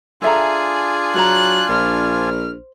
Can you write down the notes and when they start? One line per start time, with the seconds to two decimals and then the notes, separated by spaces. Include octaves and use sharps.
0.22 D4 F4 G#4 A4 E5 G#5 A#5
1.14 F#3 G#4 C#5 A#5 F#6
1.69 A#1 C5 F6